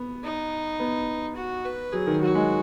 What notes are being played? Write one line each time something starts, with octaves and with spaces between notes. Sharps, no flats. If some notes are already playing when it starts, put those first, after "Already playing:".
Already playing: B3
D#4
B3
F#4
B4
F#3 G#4
D#3
F#3 F#4
G#3